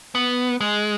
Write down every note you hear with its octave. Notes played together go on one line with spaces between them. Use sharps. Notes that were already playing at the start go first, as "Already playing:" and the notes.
B3
G#3